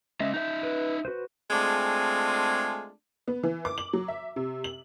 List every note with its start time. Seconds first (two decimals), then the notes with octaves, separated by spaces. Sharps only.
0.20 G#3 C#4 D#5 E5
0.34 D#4 E5 G6
0.63 B4
1.05 F#4 B4 C5
1.51 G#3 A3 C4 D4 F4 G#4
3.28 B3
3.43 E3
3.65 D6
3.78 F#7
3.93 F#3
4.08 E5
4.36 C3
4.64 F#7